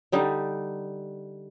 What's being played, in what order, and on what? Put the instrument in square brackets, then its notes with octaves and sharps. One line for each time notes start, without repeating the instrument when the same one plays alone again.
[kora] D3 G3 D#4